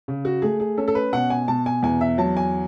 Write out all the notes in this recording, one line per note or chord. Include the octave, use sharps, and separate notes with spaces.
C#3
F#4
A3 G#4
G#4
C#4 A4
A4
B4
B2 F#5
G#5
B2 A5
G#5
E2 G#5
E5
F#3 A5
G#5